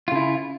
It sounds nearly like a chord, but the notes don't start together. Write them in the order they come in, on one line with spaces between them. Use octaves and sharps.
F4 C#3 E4